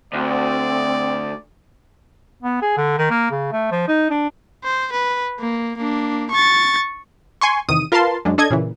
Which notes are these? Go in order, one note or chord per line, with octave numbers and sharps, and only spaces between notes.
D2 C4 D5
B3
G#4
D3
D#3
A#3
C#3
A3
F3
D#4
D4
C5
B4
A#3
A#3 D4
C#6 A6
G#5 C6 C#6
E2 C3 D#3 D#6 D#7
F4 A#4 B4 F5 A5 C6
F#2 G#3 D4
D4 A4 D#5 G#6
A#2 C#3 E3